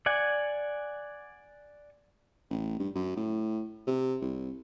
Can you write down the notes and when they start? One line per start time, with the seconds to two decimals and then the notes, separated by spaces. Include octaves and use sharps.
0.06 D5 F#5 G#5
2.50 A1
2.79 G2
2.95 F#2
3.17 A2
3.87 C3
4.22 C2